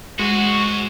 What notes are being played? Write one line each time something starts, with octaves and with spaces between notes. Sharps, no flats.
G#3 F#4 C5 D#5